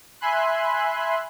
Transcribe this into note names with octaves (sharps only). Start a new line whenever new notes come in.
E5 G#5 B5 C6 F#6